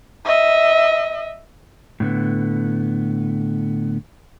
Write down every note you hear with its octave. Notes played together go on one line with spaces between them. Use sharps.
D#5 E5
A2 D3 B3